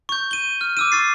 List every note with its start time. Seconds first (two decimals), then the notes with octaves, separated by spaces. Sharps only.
0.09 C#6 G6
0.31 D#7 G7
0.61 F6
0.77 D6 E6 D#7
0.92 C#6 A6 C7